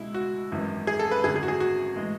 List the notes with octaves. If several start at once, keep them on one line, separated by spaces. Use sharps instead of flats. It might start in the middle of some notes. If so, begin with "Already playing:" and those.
Already playing: C#2 B2 G#3 E4
F#4
G#1 F#2 E3 G#3
G#4
A4
B4
G#1 F#2 D3 G#4
G#4
F#4
G#4
F#4
A2 E3 G#3